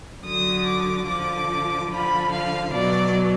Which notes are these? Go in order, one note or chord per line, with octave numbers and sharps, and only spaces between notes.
D3 F#3 D#6
D6
D3 F3 D6
D3 F3 B5
F5
B2 F#3 D5